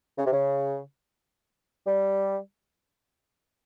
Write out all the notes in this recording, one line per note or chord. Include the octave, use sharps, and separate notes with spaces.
C#3
C3
C#3
G3